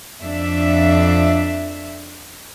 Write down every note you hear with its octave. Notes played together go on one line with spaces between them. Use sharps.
F2 D4 E5